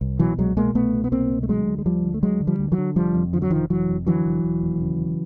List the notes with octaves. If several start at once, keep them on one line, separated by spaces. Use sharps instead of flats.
C2
B2 E3 F#3
C2 F#3 G#3
B2 G#3 A#3
C2 A3 B3
B2
B3
C2 A#3 C4
B2
A3
D2 F#3 G#3
D3
G#3
D2 F3 G3
D3
A3
D2 F#3 G#3
D3
F3 G3
D2
E3 F#3
D3
F1 F3 G3
F2
D3 F3
F#3
F1 D#3 F3
F1 E3 F#3
F2
D3 E3 F#3
F1
E1
D#2
C#3
E1